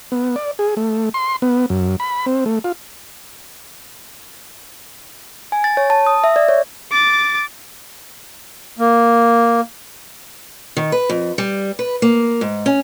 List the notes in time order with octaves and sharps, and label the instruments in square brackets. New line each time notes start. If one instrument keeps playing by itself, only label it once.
[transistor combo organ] B3
D5
G#4
A3
C6
B3
F#2
B5
C4
A3
F4
[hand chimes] G#5
A6
C#5
A5
D#6
E5
D5
C#5
[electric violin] D6 A6
[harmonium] A#3
[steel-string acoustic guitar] D#3
B4
F2
G3
B4
A#3
G#2
C#4